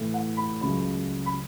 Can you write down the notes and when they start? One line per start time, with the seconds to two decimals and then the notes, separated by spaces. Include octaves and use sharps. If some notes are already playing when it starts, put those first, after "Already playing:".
Already playing: A2 E3
0.14 F#5
0.37 B5
0.61 C#2 C#3 F#3 B5
1.26 B5